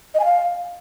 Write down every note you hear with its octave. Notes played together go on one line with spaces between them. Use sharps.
D#5
G#5
F5